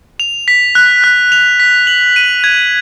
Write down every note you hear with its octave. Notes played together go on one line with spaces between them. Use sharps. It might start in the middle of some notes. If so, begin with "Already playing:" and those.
F7
B6
F#6
F#6
F7
B6
F#7
D#7
G#6